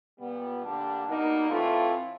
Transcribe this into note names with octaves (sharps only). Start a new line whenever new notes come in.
A#2 G3 B3
D3 G3 A#3 D4
B2 G3 A#3 D#4
A2 E3 A3 C4 F4